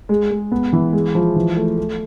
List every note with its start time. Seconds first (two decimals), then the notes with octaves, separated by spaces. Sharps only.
0.09 G#3
0.31 G#3
0.52 B3
0.73 E3
0.93 G#3
1.15 F3
1.36 E3
1.57 A3
1.77 A3